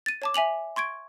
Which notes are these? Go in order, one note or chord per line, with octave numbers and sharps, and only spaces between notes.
A6 D#7
C#5 A5 D6
E5 G#5 F7 F#7
C6 C#6 G#6 D7